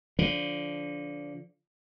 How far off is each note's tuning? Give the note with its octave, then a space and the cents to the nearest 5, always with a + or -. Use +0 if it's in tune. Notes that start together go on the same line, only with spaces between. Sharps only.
D3 -20 F3 +0